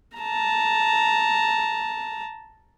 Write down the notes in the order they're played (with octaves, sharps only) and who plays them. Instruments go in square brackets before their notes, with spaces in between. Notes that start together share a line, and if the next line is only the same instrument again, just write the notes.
[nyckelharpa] A5 A#5